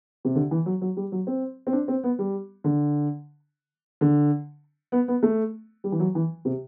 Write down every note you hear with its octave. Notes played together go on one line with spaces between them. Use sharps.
C3
D3
E3
F#3
F#3
G3
F#3
C4
C4
D4
C4
B3
G3
D3
D3
B3
B3
A3
G3
E3
F#3
E3
C3